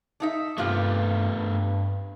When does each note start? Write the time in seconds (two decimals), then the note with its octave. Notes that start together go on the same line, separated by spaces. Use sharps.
0.20 D4 D#4 E5
0.58 G2 C3 G3 A3 B3 F4
1.31 G2